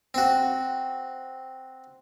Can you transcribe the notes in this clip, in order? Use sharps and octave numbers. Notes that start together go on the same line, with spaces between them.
C4 F#4